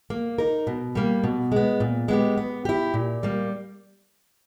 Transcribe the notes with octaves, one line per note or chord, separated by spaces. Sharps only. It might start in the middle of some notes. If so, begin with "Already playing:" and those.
A#3
D#4 A#4
B2
G3 A#3
B2
G#3 B3
A#2
G#3 B3 G4
B3
E4 G4
A#2
G3 A#3